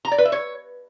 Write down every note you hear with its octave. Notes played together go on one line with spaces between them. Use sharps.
A#5
D5
B4
E5
C#5